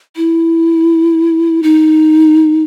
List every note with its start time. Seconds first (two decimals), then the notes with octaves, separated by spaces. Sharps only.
0.16 E4
1.63 D#4